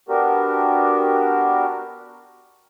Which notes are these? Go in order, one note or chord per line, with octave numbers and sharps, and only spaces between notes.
B3 D4 F#4 G4 A#4